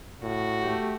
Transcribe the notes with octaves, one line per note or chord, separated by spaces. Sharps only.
A2 F#4
A3 G4